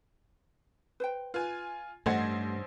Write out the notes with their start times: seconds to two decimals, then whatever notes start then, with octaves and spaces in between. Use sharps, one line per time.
1.00 B4 C5 G5
1.34 F4 B4 G#5
2.06 A1 G2 A3 C5 D#5 F#5 G#6